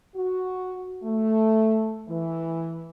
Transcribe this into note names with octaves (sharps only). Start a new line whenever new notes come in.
F#4
A3
E3